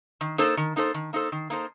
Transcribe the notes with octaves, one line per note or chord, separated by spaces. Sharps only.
D#3
A#3 D#4 A4 C5
D#3
A#3 D#4 A4 C5
D#3
A#3 D#4 A4 C5
D#3
A#3 D#4 A4 C5